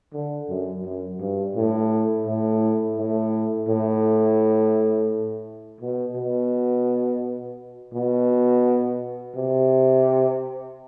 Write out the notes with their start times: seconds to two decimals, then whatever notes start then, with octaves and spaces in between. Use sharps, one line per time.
0.13 D3
0.50 F#2
0.85 F#2
1.20 G2
1.56 A2
2.27 A2
2.98 A2
3.69 A2
5.81 B2
6.17 B2
7.94 B2
9.36 C3